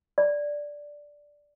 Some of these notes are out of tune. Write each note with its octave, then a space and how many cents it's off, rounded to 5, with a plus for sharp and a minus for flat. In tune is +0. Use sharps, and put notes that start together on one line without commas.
D5 -5